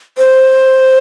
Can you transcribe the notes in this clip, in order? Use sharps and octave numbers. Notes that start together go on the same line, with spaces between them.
C5